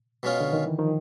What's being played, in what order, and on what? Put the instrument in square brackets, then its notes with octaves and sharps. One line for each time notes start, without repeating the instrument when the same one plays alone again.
[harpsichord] B2 G#3 C#4 F4
[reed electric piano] D3
D#3
E3
D#3 F3